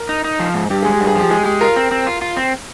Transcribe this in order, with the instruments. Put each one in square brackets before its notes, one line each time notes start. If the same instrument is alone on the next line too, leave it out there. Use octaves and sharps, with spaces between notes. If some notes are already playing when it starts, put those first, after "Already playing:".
Already playing: [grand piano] A#4
[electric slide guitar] D#4
D#4
F3
G#2
[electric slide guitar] G2 [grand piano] G4
[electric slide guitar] G#3 [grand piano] G#4
[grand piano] G4
[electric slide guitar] G2
[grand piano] G#4
[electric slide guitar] F3 [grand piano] G4
[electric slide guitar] G#3 [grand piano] G#4
[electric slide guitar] G#3 [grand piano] G4
[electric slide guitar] F4 [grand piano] A#4
[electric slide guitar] C4
C4
F4
F4
C4